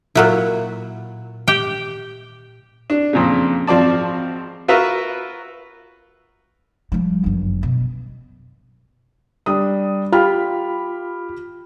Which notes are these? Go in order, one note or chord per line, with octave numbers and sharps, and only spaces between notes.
A#2 F#3 E4
G4 G5
D4
F2 A#2 C#3
G#1 F3 C4 D5 A5
F4 F#4 A#4 B4 E5
F3 G3
G1 F#2
B2
G3 D4 D#6
F4 G4 B5 F6